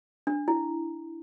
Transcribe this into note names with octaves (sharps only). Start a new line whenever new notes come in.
D4
E4